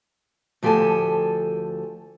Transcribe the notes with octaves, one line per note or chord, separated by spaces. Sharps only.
D2 F3 G4 A4 G#5 A5